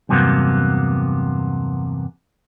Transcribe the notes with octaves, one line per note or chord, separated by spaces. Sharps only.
E2 G2 C3 F#3 A#3 B3